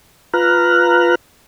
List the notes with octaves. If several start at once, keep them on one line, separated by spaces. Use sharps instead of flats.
F4 B4 A#5 F6 F#6